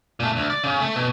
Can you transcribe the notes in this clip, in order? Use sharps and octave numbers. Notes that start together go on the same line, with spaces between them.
A#2 A3
D2
D5
C#3
A3
B2